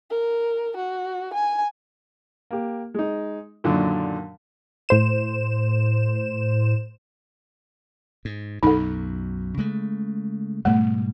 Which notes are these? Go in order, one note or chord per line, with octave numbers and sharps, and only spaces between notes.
A#4
F#4
G#5
A#3 G4
G#3 D#4
F#2 A#2 D3 D#3 F#3
A2 C5 E7
G#2
B1 F#2 B2 D#4 A4
C#3 G#3 A3
G#2 B2 G3 A3